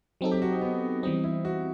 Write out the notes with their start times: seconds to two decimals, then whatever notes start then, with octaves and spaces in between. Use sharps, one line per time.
0.21 F#3 C4 D#4 A4
0.32 G4
0.42 F#4
0.52 D#4
0.62 B3
1.03 E3 G3 C4 D#4
1.24 E4
1.45 F#4